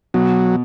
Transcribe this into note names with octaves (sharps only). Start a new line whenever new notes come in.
B2 F#3